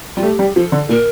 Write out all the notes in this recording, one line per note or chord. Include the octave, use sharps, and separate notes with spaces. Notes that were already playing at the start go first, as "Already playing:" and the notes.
G3 F4
A3 G4
G3
F3 A4
D3
A#2 A#4